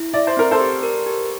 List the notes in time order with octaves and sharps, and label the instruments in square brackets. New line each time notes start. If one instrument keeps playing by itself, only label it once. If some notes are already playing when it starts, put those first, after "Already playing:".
Already playing: [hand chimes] E4
[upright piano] D5 [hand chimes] E5
[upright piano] C5
[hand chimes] C4 [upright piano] A#4
[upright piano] A4 C5
[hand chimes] G4
A#4
G4